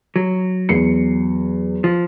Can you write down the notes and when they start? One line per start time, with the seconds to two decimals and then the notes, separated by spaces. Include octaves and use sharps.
0.16 F#3
0.69 E2 C7 C#7
1.84 F3